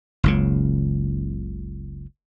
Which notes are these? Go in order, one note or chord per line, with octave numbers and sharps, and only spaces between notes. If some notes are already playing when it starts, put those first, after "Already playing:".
F#1 C#2 C#3